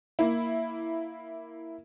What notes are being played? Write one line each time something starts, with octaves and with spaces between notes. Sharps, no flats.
A#3 E4